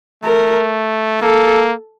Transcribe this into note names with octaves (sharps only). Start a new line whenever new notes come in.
A3 A#4
A#3 A4